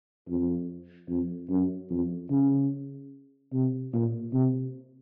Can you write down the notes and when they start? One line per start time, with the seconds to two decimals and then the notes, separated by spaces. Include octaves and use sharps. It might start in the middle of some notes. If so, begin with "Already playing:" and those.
0.29 F2
1.09 F2
1.49 F#2
1.90 F2
2.30 C#3
3.53 C3
3.94 A#2
4.33 C3